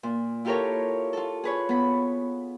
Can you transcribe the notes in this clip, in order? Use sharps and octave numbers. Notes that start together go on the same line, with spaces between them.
A#2
E4 F4 G4 A4 A#4 C#5
F4 A4
G#4 B4 C#5
B3 B5